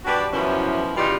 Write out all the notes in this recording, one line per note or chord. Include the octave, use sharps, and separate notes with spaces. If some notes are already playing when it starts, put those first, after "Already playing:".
G3 D4 F#4 G4 B4
F#2 B2 E3 F3 C#4 E4
C#3 E3 G3 D#4 F4 G4